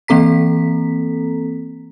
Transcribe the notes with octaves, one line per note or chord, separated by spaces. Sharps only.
E3 A#3 C4 A4 A#5 B6